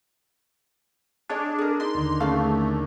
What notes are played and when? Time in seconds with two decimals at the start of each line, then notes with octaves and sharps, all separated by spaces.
1.29 D4 G#4 C#5 D#5
1.58 G#4 A#4
1.80 D#4 D#5 C6
1.95 D#2 D3 A#3
2.20 A3 C#4 G#4 F5